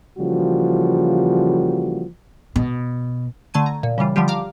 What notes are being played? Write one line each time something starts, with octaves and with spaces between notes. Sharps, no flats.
C#3 E3 F3 G3 A#3 F#4
B2
D3 A3 A5 G#6 D#7
A#5
A#2
C#3 E3 G3 F4
D3 F3 G3 F4 G4
F5 A#5 D6